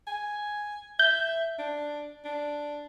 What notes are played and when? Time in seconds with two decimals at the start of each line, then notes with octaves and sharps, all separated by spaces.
0.07 G#5
0.99 E5 G6
1.59 D4
2.25 D4